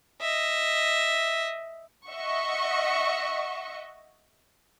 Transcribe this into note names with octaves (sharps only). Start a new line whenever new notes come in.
D#5 E5
D#5 E5 F#5 C#6